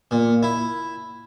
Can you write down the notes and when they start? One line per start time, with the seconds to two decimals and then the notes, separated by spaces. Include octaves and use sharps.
0.11 A#2
0.43 E4